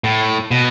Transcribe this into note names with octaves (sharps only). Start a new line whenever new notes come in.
A2
B2